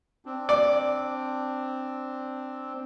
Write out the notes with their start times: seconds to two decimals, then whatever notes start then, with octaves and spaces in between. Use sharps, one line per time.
0.26 C4 D4
0.49 D5